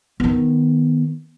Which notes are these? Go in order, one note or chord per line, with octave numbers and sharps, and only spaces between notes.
D#3 B3